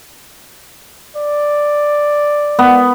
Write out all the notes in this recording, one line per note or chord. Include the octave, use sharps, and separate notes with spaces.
D5
B3